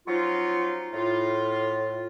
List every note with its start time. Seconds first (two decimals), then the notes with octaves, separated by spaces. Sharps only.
0.08 F3 F#3 C#4 D#4 F4
0.93 A2 F4